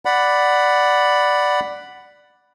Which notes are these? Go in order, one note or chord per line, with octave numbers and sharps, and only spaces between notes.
D5 F#5 B5